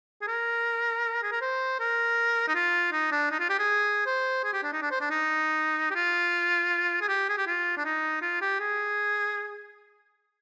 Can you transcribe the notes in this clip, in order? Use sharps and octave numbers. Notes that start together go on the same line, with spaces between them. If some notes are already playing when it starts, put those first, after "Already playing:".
G#4
A#4
G#4
A#4
C5
A#4
D#4
F4
D#4
D4
D#4
F4
G4
G#4
C5
G#4
G4
D4
D#4
D4
C5
D4
D#4
G4
F4
G#4
G4
G#4
G4
F4
D4
D#4
F4
G4
G#4